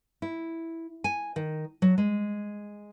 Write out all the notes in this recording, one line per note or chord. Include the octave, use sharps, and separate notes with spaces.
E4
G#5
D#3
F#3
G#3